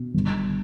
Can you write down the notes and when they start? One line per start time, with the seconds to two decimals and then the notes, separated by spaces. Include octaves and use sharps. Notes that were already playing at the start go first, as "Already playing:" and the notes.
Already playing: B2
0.14 G1